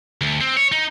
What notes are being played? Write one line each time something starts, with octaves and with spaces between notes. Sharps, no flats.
D2
C4
C#5
D#4